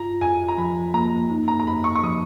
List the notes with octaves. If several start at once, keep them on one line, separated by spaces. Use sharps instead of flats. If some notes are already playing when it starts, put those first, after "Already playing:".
Already playing: F4 A#5
F2 G#5
A#5
F3 B5
A#3 A#5
D#4
A#5
A#5
F2 B5
C#6
C#6
F3 D#6